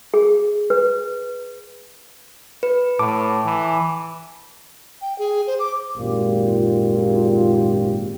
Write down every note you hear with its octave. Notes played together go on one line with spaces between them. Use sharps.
G#4
B4
B4
A2 A5 D6
E3
G5
G#4
C5
D6
G#1 F#2 A#2 F4 G4